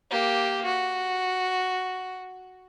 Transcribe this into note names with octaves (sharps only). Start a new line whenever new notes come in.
A#3 G4
F#4